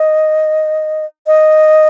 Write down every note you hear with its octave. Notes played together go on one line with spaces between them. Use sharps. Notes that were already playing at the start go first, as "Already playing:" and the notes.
Already playing: D#5
D#5